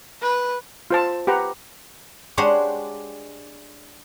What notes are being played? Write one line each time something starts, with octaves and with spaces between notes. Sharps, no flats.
B4
F4 C5 A5
G4 B4 F#5 A#5
G#3 D4 G4 C5 C#5 F#5